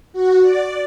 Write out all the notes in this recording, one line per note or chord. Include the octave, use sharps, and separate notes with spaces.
F#4
D5